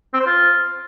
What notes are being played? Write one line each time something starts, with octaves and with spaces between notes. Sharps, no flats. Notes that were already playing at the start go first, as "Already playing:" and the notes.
C4
C5
F4